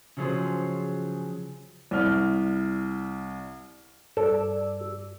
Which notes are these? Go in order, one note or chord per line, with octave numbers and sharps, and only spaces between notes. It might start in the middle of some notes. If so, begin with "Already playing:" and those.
C#3 F3 F#3 C#4 G#4 C5
C2 F6
G2 A4 D5 E6